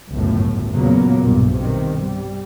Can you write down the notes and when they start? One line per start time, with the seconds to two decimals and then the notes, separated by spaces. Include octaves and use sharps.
0.10 G1 C#2 F#2 A2
0.72 E2 A#2 C#3 F#3 A#3 B3
1.22 B1 G2 A#2
1.55 G2 C3 D#3
2.04 G3